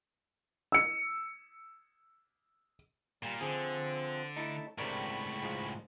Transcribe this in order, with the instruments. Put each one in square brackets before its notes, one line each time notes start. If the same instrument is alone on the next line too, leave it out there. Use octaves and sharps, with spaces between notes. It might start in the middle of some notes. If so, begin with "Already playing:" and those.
[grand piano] E6 C#7
[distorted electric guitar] A#2 [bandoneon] G3
[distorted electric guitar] D3 [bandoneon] F3 C4 [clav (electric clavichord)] G#4
[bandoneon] A3 A5 [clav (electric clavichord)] D#4 E4 A4
[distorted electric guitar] C#2 A2 [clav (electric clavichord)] C3 D4 A#4 [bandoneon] B5 C#6
[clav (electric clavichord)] G#2 F3 G#3